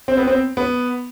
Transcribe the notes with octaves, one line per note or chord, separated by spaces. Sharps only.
C4
B3
C4
B3